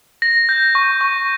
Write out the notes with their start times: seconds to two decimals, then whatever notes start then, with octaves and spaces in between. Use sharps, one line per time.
0.22 A#6
0.49 G6
0.75 C#6
1.01 C#6